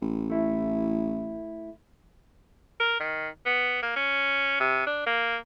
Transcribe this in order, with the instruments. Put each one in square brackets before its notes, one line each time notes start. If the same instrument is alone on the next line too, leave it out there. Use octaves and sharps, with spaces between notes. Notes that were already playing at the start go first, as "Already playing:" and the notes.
[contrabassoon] A1
[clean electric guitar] A3 E4
[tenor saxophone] A#4
D#3
B3
A#3
C#4
C3
D4
A#3